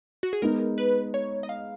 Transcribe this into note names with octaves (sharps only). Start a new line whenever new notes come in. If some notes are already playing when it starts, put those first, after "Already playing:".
F#4
G#4
G#3 B3 D#4 A#4
B4
C#5
D#5
F5